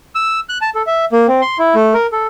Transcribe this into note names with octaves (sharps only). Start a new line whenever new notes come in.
E6
F#6
A5
A4
E5
A#3
C4
C6
E4
A3
A#4
A4